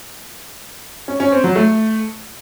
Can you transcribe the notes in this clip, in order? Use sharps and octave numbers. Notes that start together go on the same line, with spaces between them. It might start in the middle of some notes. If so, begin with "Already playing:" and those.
C#4
C#4
C4
F#3
A3